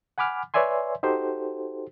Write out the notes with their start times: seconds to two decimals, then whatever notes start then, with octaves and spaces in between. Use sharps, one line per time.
0.18 F#5 G#5 B5 D6 F6
0.54 B4 C#5 D5 E5 G#5 C6
1.03 D#4 F#4 G4 A4 C5